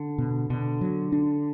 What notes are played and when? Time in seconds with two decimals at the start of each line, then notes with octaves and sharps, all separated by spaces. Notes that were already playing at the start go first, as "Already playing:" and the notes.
Already playing: D3
0.18 B2
0.50 B2 D3
0.81 F#3
1.12 D4